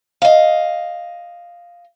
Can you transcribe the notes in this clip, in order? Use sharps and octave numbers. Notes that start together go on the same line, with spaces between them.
D#5 F5